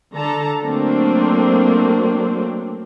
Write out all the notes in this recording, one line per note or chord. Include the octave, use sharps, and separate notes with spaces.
D3 A4 A5 A#5
F#3 A3 A#3 C4 D4